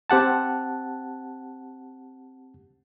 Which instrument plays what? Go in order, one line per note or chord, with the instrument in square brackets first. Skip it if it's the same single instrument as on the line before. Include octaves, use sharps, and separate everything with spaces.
[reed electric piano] C4 G4 F#5 A5